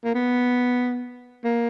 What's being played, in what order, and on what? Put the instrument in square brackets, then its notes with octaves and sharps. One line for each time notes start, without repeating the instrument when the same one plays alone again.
[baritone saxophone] A#3
B3
A#3